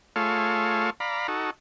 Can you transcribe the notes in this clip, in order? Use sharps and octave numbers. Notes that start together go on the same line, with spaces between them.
A3 F4 G#4 A4 C#5 F5
D5 F5 A#5 B5
D#4 F#4 A4